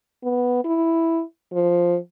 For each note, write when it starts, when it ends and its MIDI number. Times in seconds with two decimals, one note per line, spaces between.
0.23 0.64 59
0.65 1.22 64
1.54 1.97 53